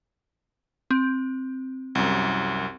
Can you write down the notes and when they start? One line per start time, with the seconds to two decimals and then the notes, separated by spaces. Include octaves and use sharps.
0.91 C4
1.95 C2 F#2